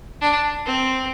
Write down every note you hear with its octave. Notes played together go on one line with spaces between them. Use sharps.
D4
C4